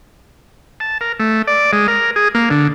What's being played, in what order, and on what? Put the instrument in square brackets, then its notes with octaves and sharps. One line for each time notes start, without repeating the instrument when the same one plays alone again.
[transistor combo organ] A5
A#4
A3
D5
G#3
A#4
G#4
A#3
D3